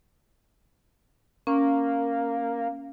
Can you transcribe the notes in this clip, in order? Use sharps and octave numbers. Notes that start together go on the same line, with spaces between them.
A#3 C#4